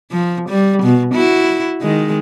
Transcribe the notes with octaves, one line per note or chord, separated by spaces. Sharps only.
F3
G3
B2
E4 F#4
D#3 G#3